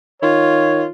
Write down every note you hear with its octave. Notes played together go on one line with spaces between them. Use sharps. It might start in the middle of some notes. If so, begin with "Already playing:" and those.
D#3 F4 C#5